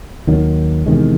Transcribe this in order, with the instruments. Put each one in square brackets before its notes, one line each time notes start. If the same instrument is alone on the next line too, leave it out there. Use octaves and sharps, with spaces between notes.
[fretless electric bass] D#2 D#3 F#3
E2 C3 D#3 G#3